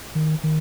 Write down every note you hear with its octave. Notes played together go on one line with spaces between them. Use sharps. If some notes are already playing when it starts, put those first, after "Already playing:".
D#3
D#3